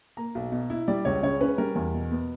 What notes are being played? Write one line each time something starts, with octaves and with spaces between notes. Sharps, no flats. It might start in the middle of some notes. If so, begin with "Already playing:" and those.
A#3 A#5
B1
B2
E4
G3 D5
C#2 C#5
C#3 C#5
C#4 B4
G3 A#4
E2
B2
B3